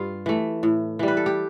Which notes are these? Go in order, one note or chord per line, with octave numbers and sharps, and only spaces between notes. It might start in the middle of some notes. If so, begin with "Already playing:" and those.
Already playing: G2 F4
E3 A3
A2
E3 G3
B4
A4
G4